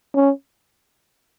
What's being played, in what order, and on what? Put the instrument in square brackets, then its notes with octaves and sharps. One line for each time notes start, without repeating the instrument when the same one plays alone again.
[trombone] C#4